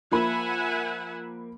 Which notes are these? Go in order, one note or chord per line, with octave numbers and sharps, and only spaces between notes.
F3 A#3 E5 F#5 G#5 B5